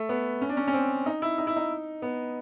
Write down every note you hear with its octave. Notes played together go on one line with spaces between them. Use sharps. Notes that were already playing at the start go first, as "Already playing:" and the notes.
Already playing: A3
B3
C#4
D4
C#4
C#4
C4
D#4
E4
D#4
E4
D#4
B3